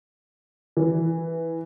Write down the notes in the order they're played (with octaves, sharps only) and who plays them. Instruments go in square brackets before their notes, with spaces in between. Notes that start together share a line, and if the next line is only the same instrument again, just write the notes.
[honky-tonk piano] E3